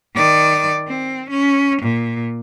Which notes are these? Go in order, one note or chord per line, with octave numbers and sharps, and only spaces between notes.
D#3 D5
C4
C#4
A#2